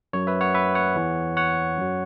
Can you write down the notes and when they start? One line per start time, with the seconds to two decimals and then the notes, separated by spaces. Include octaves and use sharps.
0.13 F#2 F#3 C#5
0.27 B4 E5
0.41 C#5 F#5
0.54 B4 E5
0.75 C#5 F#5
0.96 E2 E3
1.37 C#5 F#5
1.78 F#2 F#3